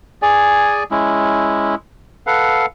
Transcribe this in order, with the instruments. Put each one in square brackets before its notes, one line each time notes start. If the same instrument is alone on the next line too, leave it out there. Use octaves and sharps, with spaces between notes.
[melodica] G#4 D5 G#5
G#3 C#4 E4
A4 B4 F5 F#5